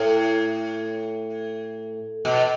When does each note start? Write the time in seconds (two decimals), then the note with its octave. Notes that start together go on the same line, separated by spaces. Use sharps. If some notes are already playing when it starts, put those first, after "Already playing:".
Already playing: A2
2.25 B2